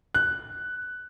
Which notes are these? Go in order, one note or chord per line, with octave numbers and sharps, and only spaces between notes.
F#6